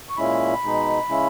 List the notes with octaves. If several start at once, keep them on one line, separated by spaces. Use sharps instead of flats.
C#6
A#2 G#3 C#4 E4 B5
B2 G#3 D#4
C#3 G#3 C#4 E4